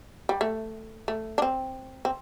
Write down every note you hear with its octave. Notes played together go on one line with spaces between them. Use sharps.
G3
A3
A3
D4
C4
C4